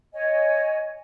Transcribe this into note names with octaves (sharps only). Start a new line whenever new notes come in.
C#5 D#5 G#5